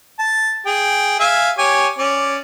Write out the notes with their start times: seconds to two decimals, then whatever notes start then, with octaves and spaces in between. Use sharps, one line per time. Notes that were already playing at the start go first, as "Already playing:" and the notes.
0.19 A5
0.66 G#4 G5
1.19 E5 F5 G#5
1.58 G4 C#5 G#5
1.98 C#4 D5